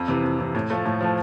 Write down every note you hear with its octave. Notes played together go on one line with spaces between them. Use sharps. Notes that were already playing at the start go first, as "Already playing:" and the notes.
Already playing: F2
C3 E3
F2
C3 E3
A2
F3 A3
A2
F3 A3